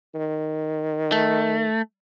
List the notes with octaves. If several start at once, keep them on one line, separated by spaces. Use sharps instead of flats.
D#3
A3